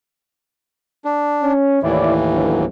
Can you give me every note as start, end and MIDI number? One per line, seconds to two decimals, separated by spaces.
1.05 1.53 62
1.42 1.79 61
1.83 2.65 39
1.83 2.65 45
1.83 2.65 52
1.83 2.14 64
1.83 2.14 73
1.83 2.14 74
2.32 2.67 31
2.32 2.67 38
2.32 2.67 54